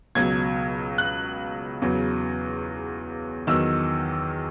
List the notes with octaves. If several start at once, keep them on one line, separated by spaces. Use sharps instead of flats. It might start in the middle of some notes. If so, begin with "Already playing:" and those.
C#2 B2 F#3 G#6
F#6
E2 C#3 F#3
E2 D#3 F#3 E6